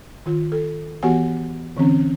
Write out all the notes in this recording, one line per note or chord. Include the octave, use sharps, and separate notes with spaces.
D#3 F4
A4
E3 B3 F#4 G4 F#5 G#5
D3 E3 C4 C#4